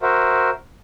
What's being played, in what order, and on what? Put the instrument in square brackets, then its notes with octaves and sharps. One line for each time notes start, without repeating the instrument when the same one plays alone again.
[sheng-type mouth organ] F#4 A#4 C5 E5